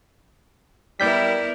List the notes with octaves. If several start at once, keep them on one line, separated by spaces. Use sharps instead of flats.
G3 B3 E4 A#4 D5 G6 B6